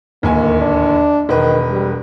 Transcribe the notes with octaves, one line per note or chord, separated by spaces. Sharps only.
D1 D#2 A#3 G#5
D4
E1 D#3 B4
G3